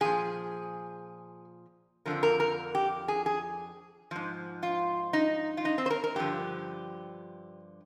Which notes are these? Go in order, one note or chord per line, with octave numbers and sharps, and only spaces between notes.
A#2 F3 G#4
F2 D3 F3 A#4
A#4
A#4
G4
G#4
G#4
G#2 F3
F4
D#4
F4
D#4
C4
C5
A#4
A#4
G2 D3 F3 G4